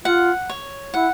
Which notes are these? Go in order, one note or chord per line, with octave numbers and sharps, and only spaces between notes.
F4 F#5
C#5
E4 F#5